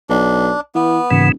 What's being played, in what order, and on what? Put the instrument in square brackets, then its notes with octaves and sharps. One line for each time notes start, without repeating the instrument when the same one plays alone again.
[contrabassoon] B1 [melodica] D4
[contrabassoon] E3 [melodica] B3
[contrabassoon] D#1 [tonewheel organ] G#2 C#3 E3